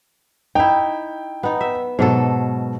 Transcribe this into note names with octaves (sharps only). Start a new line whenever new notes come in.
D#4 E4 G5
B3 D#4
E5
G#2 B2 F#3 A4